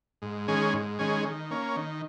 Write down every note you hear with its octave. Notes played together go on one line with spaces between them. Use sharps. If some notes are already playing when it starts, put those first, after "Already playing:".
G#2
D#3 G#3 C#4 G#4
G#2
D#3 G#3 C#4 G#4
D#3
A#3 C#4
D#3